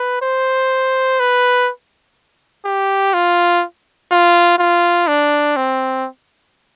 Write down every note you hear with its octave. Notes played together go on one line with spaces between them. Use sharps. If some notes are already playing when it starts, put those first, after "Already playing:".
Already playing: B4
C5
B4
G4
F4
F4
F4
D4
C4